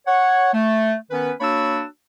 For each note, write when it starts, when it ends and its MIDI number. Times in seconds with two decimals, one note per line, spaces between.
0.06 0.49 73
0.06 0.49 78
0.54 0.93 57
1.11 1.31 51
1.11 1.31 59
1.11 1.31 61
1.11 1.31 71
1.40 1.82 58
1.40 1.82 62
1.40 1.82 66
1.40 1.82 73
1.40 1.82 83
1.40 1.82 88